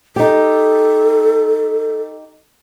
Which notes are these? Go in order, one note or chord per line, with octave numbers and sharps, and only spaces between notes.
D#4 G4 A4